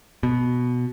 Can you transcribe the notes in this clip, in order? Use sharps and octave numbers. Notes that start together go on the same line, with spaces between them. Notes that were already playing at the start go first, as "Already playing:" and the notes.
B2